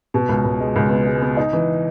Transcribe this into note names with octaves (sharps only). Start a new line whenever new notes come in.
B2
C#2
C#2
G#3
C#2
B3
G#3
B3
D#4
E3